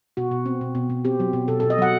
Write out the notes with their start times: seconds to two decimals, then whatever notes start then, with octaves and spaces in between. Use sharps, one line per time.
0.17 B2 F#4
0.31 B2
0.46 C4
0.61 B2
0.75 B2
0.90 B2
1.05 C4 G4
1.20 F#3
1.33 B2
1.48 B2 A4
1.60 B2 A4
1.70 D#5
1.78 F#3 F#5